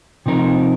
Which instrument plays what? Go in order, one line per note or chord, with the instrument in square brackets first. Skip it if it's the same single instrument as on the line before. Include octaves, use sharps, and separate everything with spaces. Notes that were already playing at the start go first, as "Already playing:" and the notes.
[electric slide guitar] C3 F3 C4 D#4 A#4